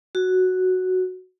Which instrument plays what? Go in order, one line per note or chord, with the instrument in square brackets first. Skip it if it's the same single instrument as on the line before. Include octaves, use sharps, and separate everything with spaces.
[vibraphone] F#4